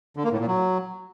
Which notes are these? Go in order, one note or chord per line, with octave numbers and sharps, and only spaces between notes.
D3
A#3
A2
A#2
F#3